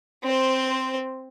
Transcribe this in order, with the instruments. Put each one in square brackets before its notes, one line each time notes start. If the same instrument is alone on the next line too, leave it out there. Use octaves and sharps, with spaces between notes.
[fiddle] C4 C5